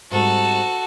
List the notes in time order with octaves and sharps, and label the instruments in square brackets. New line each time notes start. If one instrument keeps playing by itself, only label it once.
[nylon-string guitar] G#2 G3 C4 [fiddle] F#4 A4